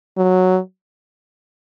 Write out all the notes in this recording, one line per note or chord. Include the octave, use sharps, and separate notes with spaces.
F#3